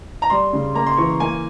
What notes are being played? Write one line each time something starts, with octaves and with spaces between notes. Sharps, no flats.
A#5
G3 C6
C#3
A#3 A#5
C6
E3 C#6
A#3 G#5